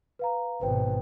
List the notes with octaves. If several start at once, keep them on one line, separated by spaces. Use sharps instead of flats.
B4 F5 A#5
G#1 B2 B4 C5 G5